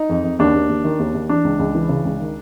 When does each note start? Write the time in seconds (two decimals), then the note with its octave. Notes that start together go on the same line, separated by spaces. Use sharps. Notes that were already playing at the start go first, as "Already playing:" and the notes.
Already playing: D#4
0.09 F2
0.24 F2
0.39 D#2 D4
0.54 D#2
0.69 D#2
0.84 D#3
0.99 D#2
1.14 D#2
1.29 E3 D4
1.45 C#2
1.59 C#2
1.75 E3
1.89 C#3
2.05 C#2
2.20 D#3